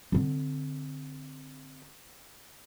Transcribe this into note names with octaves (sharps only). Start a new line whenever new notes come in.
D3 C4